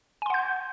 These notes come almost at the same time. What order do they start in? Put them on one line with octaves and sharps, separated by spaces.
G#5 C6 F#5 G6